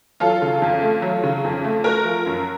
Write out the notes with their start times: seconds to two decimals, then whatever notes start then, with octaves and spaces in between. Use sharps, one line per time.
0.20 F#3 F4 A4
0.42 C#3
0.62 F2
0.82 A3
1.02 F#3
1.24 C#3
1.44 F2
1.64 A3
1.84 A3 F#4 A#4
2.05 F3
2.26 F#2